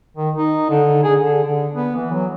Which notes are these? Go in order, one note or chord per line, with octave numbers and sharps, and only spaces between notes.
D#3
D#4
D3
G#4
D3
D3
B3
E3
F#3